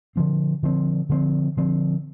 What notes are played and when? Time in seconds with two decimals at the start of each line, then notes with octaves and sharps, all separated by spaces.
0.16 D3 F3 C4
0.63 D3 F3 C4
1.09 D3 F3 C4
1.57 D3 F3 C4